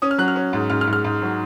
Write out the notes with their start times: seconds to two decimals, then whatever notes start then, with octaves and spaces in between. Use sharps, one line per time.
0.02 C#4 D#6
0.11 F6
0.18 F#3 F#6
0.28 F6
0.36 C#4
0.53 G#2
0.70 G#2 F6
0.81 F6
0.87 G#2
0.93 F6
1.04 G#2
1.22 F#3